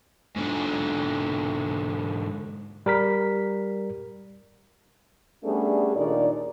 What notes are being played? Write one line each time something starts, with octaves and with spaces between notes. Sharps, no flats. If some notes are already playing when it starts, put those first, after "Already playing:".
G#2 D3
G3 A#4 B6
G3 A3 B3 C#4 D4 G#4
D#2 A#2 D4 D#4 D5